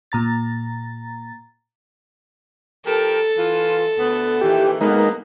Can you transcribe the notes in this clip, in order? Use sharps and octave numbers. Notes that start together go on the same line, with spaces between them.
A#2 A#5 A6
F3 G4 A4 A#4
E3 F4
D2 B3
A#2 D#3 E3 G4
G#3 A#3 B3 D#4 A#4